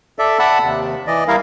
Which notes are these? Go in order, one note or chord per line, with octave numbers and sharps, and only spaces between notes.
A4 D5 E5
D5 E5 F#5 A5 B5
D#2 C3
E3 D5 D#5
G3 E4 A#4 F5